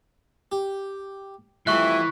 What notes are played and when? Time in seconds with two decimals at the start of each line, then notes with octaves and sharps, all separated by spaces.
0.52 G4
1.67 F2 E3 G3 A3 E5 C#6 F#6